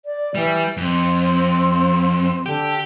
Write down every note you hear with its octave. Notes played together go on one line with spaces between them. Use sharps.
D5
E3 G3
F2 C4
D3 G4